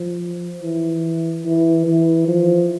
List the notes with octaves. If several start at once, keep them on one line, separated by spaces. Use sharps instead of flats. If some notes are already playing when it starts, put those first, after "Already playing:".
Already playing: F3
E3
E3
E3
F3